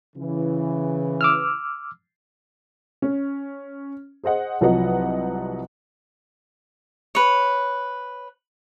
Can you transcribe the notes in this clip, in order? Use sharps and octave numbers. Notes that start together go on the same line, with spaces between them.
C#3 E3
D6 E6 F6
C#4
G#4 C5 D#5 F#5
C2 F3 F#3 B4 D#5 F#5
B4 C#5